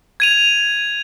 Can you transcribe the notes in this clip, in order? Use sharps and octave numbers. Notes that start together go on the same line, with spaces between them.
G#6 D#7 F7